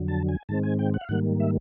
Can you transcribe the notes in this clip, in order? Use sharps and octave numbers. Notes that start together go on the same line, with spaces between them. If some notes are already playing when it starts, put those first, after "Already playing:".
Already playing: F2 D3 F#3
A5
G#5
G#2 D#3 G#3 C4 A5
G#5
G5
F#5
F5
G#2 D#3 G3 A#3 F#5
E5